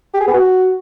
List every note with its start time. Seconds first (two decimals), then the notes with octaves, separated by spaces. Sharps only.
0.14 G4
0.21 G#4
0.27 B3
0.34 F#4